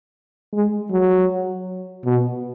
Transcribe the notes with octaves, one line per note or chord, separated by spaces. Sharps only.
G#3
F#3
B2